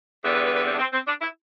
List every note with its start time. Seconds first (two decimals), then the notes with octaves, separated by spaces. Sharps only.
0.24 E2 D3 G3 B3 B4
0.34 B4
0.45 B4
0.55 B4
0.66 C4
0.73 D4
0.79 C4
0.93 C4
1.07 D4
1.21 E4